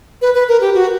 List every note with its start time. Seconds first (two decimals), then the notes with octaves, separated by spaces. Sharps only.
0.22 B4
0.34 B4
0.48 A#4
0.61 G4
0.75 F#4